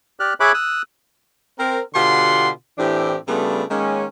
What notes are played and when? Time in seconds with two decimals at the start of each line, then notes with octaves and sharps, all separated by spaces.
0.20 G4 D5 F6 F#6
0.40 G#4 C#5 E5 B5 D6 F#6
0.54 D#6 E6 F#6
1.58 C4 A#4
1.94 B2 D3 F4 G4 F#5 C6
2.78 A2 E3 C4 D4 G4
3.28 C#3 G3 A3 B3 D4 F4
3.70 D#3 G#3 A#3 C#4